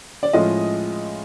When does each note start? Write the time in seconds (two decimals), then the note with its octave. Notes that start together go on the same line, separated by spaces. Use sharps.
0.23 D5
0.33 A2 F3 G#3 C#4 F4 D#5